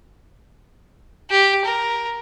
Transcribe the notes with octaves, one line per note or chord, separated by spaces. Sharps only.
G4
A#4